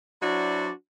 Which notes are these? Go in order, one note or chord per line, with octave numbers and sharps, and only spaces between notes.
F#3 D4 E4 F#4 C5 D5